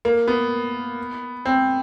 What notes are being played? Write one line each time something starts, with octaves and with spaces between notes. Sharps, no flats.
A#3
B3
C4